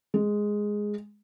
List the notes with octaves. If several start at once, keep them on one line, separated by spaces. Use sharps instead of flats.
G#3